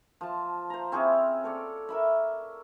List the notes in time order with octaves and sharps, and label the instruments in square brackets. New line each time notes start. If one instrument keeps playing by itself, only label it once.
[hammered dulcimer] F3 A5
C5 A#5
C4 C#4 E4 G#4
A4 C#5 D5
A#4 E5 B5